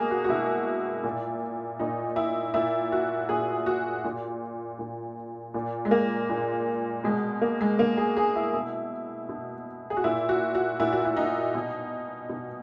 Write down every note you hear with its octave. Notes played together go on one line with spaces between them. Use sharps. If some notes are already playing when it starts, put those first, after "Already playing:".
Already playing: B2 G#3 A#3 G#4
F#4
F#4
B2 E4
A#2
A#2 D#4
E4
A#2 E4
F#4
A#2 G#4
F#4
A#2
A#2
A#2
G#3
A#3
A#2
B2 G#3
A#3
G#3
B2 A#3
G#4
G#4
E4
B2
B2
G#4
F#4
A#2 E4
F#4
F#4
A#2 E4
F#4
E4
D#4
B2
B2